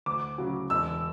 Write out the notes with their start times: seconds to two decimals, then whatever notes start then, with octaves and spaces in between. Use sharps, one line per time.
0.06 D2 D6
0.38 C#3 F#3
0.70 E1 E6